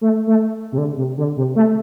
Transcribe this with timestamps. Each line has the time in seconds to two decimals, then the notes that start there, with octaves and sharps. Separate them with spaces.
0.01 A3
0.27 A3
0.72 C3
0.78 D3
0.97 C3
1.18 D3
1.37 C3
1.56 A3